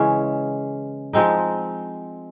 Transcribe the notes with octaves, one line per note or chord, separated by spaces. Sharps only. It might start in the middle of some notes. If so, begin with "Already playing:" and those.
Already playing: C#3 E3 G#3 C#4
F3 G#3 C4 D#4